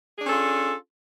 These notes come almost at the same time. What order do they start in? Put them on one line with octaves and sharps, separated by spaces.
G#4 D4 C#4 A4 F4